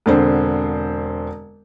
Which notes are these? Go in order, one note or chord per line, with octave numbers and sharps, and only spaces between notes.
E1 D3 C4